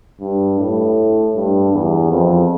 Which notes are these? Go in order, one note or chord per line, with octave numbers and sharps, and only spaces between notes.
G2
A2
G2
E2
F2